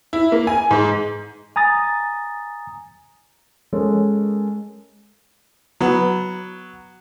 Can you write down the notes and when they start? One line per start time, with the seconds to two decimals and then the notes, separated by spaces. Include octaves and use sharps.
0.13 E4
0.32 A#3
0.47 G#5
0.71 G#2
1.56 G#5 A#5 D#6 A6
3.73 G#3 C#4 A4 A#4 C#5 D#5
5.81 F#3 B3